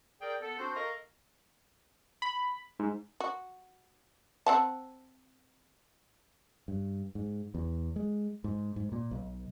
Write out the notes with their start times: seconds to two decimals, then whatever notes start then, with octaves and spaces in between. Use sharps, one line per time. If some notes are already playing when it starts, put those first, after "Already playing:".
0.22 G#4 A#4 D5 G5
0.42 B3 A4
0.58 C4 D4 F#4 C5
0.75 A4 A#4 D#5 F5 A#5 C#6
2.22 B5
2.79 G#2
3.20 F#4
4.46 C4 F#5 A5
6.68 G2
7.15 G#2
7.54 E2
7.96 G#3
8.44 G#2
8.76 G#2
8.92 A#2
9.11 B1